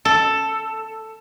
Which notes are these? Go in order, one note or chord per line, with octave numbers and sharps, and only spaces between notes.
A4